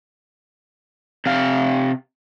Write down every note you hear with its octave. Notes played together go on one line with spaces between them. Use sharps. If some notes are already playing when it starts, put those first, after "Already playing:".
C3 F5